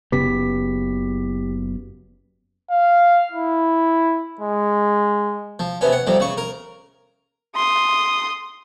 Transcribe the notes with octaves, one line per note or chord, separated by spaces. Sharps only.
F#1 C#3 B3 G4 B6
F5
E4
G#3
F3
C3 B3 C#4
F#5
F2 C3 G3
C#3 C#6
A#4
C6 D#6